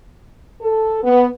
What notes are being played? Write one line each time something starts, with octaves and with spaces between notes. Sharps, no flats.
A4
B3